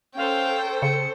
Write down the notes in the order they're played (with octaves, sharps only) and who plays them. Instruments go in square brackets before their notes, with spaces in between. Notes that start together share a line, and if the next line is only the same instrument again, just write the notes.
[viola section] C#4 A4 C5 [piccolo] F5 [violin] G5
[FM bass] C#3 [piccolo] C#7